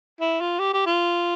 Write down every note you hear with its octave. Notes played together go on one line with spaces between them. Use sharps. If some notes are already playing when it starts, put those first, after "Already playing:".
E4
F4
G4
G4
F4